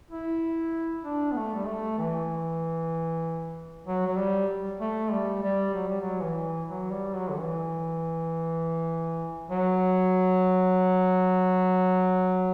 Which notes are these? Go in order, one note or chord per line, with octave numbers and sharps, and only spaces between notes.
E4
D4
B3
A3
G3
A3
E3
F#3
F#3
G3
A3
G3
G3
F#3
G3
F#3
E3
F#3
G3
F#3
D3
E3
F#3